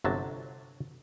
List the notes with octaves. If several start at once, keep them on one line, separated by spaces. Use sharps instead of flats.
G1 C3 F#3 A5